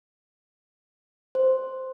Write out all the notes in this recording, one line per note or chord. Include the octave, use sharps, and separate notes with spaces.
C5